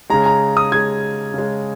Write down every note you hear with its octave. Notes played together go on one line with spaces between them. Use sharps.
C#3 G#3 A#5
A#5
D#6
C#3 G#3 G#6
C#3 G#3